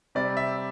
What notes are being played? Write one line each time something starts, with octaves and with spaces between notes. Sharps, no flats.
C3 G3 C4 D5
E5